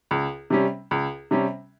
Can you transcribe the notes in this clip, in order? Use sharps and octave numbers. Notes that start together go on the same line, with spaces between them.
C#2
C3 G3 C#4
C#2
C3 G3 C#4